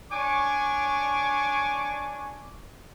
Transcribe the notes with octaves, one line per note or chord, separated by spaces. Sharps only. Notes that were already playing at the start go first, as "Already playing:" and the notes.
D4 C#5 G#5 C#6 D6